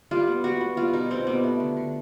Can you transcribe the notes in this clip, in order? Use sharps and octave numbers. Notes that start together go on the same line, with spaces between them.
G3 F4
B3
G3 F#4
B3
G3 F4
B2 D#4
B2 C4
G3 B3
A3
D3
D3